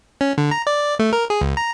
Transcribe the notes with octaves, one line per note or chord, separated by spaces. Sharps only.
C#4
D3
A#5
D5
A3
A#4
G#4
C#2
A#5